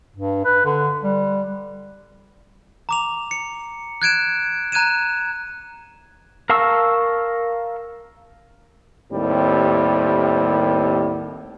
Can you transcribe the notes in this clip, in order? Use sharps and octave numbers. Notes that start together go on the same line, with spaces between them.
G2
B4
D3
G3
A#5 D6 F7
C#7
F#6 G#6 D7 E7
A#5 F#6 G#6 D#7 E7
A#4 F5 A5 C#6 E6
D#2 A2 G3 C4